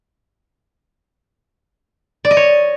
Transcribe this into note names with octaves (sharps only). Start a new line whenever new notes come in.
D5
D#5
C#5